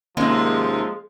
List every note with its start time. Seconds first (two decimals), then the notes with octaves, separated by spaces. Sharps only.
0.17 D#2 C3 F3 G#3 A#3 C#4